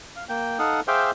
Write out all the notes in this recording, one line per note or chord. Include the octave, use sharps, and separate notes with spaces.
F5
A#3 G5
D#4 A4 F5 F#5 D#6
G#4 C5 E5 F5 G5 D6